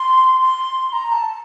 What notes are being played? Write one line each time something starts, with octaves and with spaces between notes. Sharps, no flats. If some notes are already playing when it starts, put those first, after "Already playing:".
Already playing: C6
C6
C6
A#5
A5